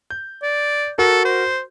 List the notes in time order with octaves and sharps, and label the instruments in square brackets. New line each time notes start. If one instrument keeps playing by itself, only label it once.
[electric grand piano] G6
[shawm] D5
[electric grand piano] F#4 A#4 [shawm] A4
[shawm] C5